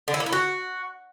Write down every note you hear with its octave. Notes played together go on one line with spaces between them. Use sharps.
D3
E4
A#3
E4
F#4